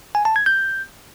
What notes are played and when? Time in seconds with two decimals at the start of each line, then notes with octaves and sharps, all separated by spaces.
0.15 G#5
0.25 A5
0.36 G#6
0.46 G6